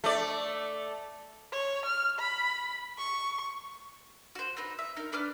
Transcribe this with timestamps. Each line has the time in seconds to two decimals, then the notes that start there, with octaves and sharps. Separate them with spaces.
0.04 A3 D5
1.52 C#5
1.86 F6
2.20 B5
2.98 C#6
4.35 F#4 C5
4.57 C4 D#4 B4
4.79 E5
4.97 D#4 A#4
5.12 D4 B4 D6 F6